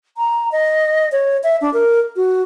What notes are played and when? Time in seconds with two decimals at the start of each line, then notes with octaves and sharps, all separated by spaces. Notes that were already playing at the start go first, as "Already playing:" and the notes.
0.17 A#5
0.52 D#5
1.12 C#5
1.43 E5
1.61 D4
1.73 A#4
2.16 F#4